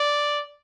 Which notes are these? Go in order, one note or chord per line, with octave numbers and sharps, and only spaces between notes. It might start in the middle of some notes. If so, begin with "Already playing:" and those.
Already playing: D5